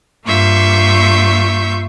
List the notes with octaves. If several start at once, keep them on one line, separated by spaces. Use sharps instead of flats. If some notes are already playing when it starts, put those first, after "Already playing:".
G2 A#3 F4 E5 C#6 G6